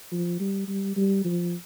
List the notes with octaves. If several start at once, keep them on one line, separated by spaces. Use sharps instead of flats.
F3
G3
G3
G3
F3